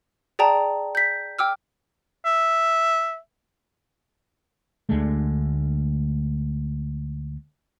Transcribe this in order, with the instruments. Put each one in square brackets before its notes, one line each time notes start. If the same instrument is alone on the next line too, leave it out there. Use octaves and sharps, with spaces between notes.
[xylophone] G#4 D5 G5 A5 A#5
G6 B6
G5 D6 E6 F6
[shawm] E5
[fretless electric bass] D2 D3 G#3 A3